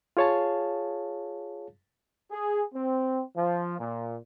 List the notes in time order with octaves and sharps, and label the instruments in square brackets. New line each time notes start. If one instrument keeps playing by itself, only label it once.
[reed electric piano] F4 G#4 C#5 F5 A5
[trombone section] G#4
C4
F3
A#2